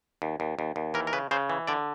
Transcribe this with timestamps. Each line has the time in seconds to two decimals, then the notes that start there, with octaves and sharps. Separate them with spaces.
0.22 D#2
0.40 D#2
0.59 D#2
0.76 D#2
0.94 E3 A#4
1.07 A#4
1.13 C#3 B4
1.31 C#3 C5
1.49 E3
1.67 D3 D5